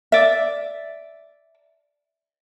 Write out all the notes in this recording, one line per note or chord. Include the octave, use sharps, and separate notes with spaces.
D5 E5